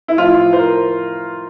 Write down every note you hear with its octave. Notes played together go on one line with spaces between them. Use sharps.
E4
A2 F3 F4
C5
A#4